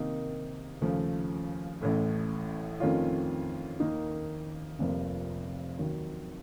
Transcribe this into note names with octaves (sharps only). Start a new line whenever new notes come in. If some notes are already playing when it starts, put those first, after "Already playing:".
Already playing: C3 D#3 A#3 D#4
D#2 C#3 F3 A3
A1 A2 A3
F2 D#3 A3 C#4 F4
D#2 D#3 A#3 D#4
F1 F2 C3 F3 A#3
D#2 D#3 F#3